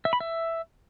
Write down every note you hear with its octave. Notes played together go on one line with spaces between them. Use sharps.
E5
B5
E5